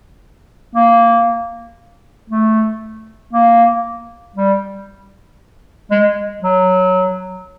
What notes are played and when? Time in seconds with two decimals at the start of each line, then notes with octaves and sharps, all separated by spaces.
0.76 A#3
2.30 A3
3.33 A#3
4.36 G3
5.91 G#3
6.43 F#3